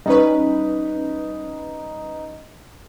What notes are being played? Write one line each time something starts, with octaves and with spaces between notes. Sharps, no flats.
G3 C#4 D#4 B4